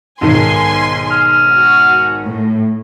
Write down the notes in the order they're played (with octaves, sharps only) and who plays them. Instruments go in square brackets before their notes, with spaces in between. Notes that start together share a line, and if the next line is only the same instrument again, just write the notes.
[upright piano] B1 G#2 D#3 [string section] G#5 C6
[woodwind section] G#5 D#6 F6
[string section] F#4
A2